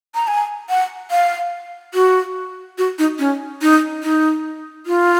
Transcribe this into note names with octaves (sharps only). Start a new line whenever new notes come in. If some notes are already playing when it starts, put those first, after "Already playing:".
A#5
G#5
F#5
F5
F#4
F#4
D#4
C#4
D#4
D#4
F4